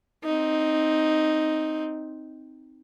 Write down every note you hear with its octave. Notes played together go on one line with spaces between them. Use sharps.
C4 D#4